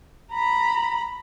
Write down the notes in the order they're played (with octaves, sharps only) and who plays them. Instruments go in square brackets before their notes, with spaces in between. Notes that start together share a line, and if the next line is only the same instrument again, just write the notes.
[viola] A#5 B5